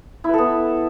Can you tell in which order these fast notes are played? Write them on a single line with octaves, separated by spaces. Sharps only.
E4 B4 A4 B3